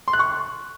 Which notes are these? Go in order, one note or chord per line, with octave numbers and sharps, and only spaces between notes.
C6
F#6
C#6